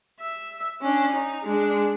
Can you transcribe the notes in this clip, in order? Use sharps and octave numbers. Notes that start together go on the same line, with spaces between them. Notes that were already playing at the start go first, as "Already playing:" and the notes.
E5
C#4 D4
D#4
G#3 D4